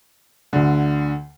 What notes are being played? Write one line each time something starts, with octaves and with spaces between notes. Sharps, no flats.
D2 D3